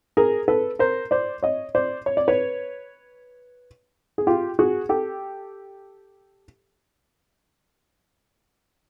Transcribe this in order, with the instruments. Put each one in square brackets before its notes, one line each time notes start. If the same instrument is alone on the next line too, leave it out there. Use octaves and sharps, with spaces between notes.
[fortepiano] G#4 A#4
A4 B4
A#4 C5
C5 D5
C#5 D#5
C5 D5
C#5
D5
B4 C#5
G#4
F4 G4
F#4 G#4
G4 A4